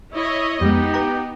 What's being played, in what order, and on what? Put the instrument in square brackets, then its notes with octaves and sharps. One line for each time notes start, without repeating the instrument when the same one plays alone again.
[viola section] E4 C#5 D#5
[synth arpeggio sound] F2 G#3 [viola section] B3 D#4 [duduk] G4
[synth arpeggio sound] B4 G5 A#5